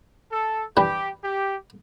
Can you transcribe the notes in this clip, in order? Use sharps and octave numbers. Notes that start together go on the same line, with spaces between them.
A4
E3 G3 D4 G4 B4
G4